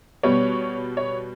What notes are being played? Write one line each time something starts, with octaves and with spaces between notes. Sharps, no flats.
B2 G3 B3 C#5
C#5